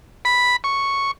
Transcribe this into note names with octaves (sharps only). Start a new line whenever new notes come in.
B5
C#6